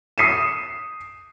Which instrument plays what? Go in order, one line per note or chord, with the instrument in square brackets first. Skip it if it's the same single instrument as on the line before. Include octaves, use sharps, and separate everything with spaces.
[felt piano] D#6 C7 D#7 E7